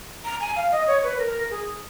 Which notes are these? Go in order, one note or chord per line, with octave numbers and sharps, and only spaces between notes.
A#5
G#5
F5
D#5
C#5
B4
A#4
G#4